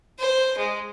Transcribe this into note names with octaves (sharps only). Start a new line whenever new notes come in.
C5
G#3